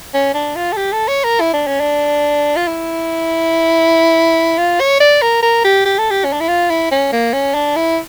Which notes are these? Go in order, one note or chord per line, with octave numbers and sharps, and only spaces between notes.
C#4
D4
F4
A4
G4
A4
C#5
A#4
E4
D4
C#4
D4
F4
E4
F4
C#5
D5
A#4
A#4
G4
G4
A4
G4
C#4
D4
E4
F4
E4
C#4
A#3
C#4
D4
E4